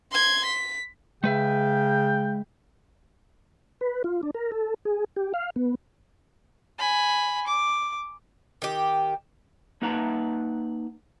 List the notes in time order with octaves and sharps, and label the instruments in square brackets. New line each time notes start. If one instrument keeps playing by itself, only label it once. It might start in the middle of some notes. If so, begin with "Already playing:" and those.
[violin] C6 G#6
B6
[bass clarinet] C#3 [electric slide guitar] G#3 B4 E5 [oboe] G5
[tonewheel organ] B4
F4
D4
A#4
A4
G#4
G4
F5
B3
[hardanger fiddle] G#5 B5
D6
[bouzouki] D#3 G4
[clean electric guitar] A#3 D#4 B4 F#5 A5 A#5